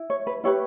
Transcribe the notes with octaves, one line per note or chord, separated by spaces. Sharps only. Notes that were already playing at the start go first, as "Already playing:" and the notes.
Already playing: E4
C#5
B4
E4 G4 B4 C#5